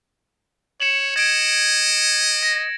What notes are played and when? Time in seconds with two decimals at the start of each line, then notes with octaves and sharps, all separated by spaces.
0.80 C#5 C#7 E7 F#7
1.16 D#5 G#6 D7
2.43 A#6